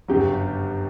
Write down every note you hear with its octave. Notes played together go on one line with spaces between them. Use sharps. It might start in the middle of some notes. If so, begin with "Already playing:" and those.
G1 F#2 C#3 F#3 G4